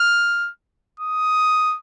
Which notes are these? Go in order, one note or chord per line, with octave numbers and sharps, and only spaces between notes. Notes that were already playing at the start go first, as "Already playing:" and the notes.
Already playing: F6
D#6